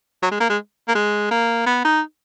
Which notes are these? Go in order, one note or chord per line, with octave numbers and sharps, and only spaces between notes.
F#3
G#3
A#3
G#3
A#3
G#3
A#3
B3
D#4